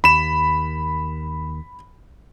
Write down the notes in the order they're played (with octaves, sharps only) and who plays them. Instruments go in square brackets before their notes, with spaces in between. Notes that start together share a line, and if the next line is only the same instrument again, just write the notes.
[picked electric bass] D#2 [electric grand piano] B5 E7